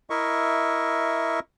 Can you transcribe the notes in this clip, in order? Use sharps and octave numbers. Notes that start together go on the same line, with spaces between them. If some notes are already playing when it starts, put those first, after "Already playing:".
E4 A#4 D#5 E5 C#6